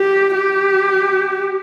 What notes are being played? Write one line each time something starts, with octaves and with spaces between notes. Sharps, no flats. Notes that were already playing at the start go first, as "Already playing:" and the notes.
Already playing: G4
G4